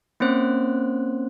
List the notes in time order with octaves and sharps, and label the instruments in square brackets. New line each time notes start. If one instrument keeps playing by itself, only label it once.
[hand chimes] A#3 C4 C#4 C5 F#6